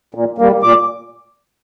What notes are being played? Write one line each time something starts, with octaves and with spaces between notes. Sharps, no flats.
A#2
G3 A#3
A#2 D6